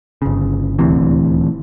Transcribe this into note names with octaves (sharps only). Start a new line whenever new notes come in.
G1 C#3
D#1 D2 C3 E3